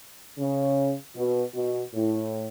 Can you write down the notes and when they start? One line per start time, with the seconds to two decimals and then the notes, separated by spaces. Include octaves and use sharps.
0.39 C#3
1.16 B2
1.55 B2
1.94 A2